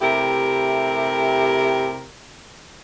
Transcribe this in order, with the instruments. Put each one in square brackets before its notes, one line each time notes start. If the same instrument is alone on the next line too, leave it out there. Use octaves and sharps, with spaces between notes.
[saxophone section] C3 A3 E4 G4 A#4